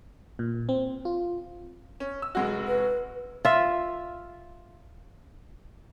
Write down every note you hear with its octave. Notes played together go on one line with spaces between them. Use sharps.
A#2
C4
F4
C#4
E6
F1 G#3 F#4
B4
F4 E5